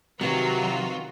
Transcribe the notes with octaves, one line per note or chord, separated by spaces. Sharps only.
C3 D#3 F#3 C4 F4 F#4 B4 C#5